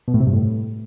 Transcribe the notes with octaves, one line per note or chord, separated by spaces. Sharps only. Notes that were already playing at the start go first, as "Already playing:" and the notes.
B2
A2
C3
G2
A2